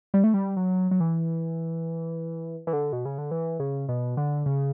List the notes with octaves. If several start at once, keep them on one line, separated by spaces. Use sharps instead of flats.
G3
A3
G3
F#3
F#3
E3
E3
D3
B2
C#3
D3
E3
C#3
B2
D3
C#3